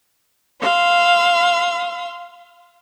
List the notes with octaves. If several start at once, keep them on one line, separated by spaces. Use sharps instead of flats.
F5 C6 E6